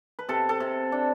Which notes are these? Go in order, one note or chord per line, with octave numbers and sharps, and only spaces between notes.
B4
C3 A4
A4
C3
D4